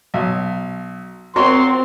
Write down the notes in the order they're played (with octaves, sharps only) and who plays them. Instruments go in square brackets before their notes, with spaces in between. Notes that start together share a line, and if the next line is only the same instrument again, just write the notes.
[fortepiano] B1
[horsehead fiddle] C4 [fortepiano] F#4 A#4 C#5 [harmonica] C6